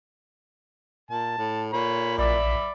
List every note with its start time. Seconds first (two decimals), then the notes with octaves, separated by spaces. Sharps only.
1.11 A#2 A5
1.38 A2
1.73 A#2 C#5 B5
2.18 A#1 D5 E5 B5 D6